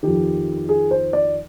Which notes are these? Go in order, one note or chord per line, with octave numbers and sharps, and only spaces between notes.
F2 D#3 G4
G#4
C5
D5